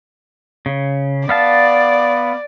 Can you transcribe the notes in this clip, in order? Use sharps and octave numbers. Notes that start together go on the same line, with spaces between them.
C#3
B3 D5 F5 A5